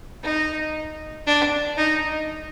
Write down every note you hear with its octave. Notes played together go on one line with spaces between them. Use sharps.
D#4
D4
D#4